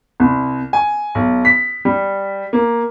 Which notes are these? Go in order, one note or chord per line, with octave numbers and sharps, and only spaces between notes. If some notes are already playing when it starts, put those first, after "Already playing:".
C2
G#5
B1
B6
G3
A#3